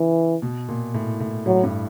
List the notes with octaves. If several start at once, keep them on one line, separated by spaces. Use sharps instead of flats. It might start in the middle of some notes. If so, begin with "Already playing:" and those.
Already playing: C#3 E3
B2
A#2
A2
A2
A2 F#3
G2